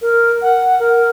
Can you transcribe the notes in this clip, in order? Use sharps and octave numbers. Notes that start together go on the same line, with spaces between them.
A#4
F#5
A#4